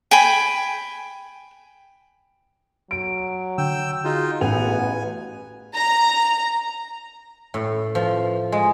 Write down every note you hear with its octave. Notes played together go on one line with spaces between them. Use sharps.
G5 G#5 B5
F#3 D7
D3 G5 E6
D#4 F4 F#4 G#4 F5
A1 B3 F#5 G#5 F7
A#5
A2
F3
G#3